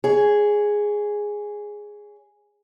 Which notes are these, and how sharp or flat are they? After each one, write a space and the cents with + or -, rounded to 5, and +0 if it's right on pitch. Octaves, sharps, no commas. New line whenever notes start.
G#4 +0 C#5 +20